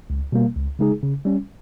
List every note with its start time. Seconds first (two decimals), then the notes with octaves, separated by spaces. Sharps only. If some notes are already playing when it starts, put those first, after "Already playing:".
0.10 C#2
0.32 B2 G3 A#3
0.56 C#2
0.79 C#3 G#3 D#4 G#4
1.03 C#3
1.25 G3 C#4